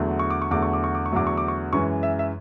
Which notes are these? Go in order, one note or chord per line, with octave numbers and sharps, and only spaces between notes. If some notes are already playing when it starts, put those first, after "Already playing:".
Already playing: E2 D3 F#3 A3
C#6
D6
C#6
E2 D3 F#3 A3 D6
C#6
D6
C#6
D6
C#6
E2 D3 F#3 A3 D6
C#6
D6
C#6
F#2 E3 G#3 C#6
E5
E5